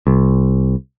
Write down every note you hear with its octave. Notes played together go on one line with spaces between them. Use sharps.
C2